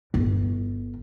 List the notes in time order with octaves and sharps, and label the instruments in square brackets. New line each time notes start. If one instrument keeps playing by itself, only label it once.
[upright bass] G1